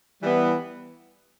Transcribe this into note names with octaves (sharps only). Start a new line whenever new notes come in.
E3 G3 B3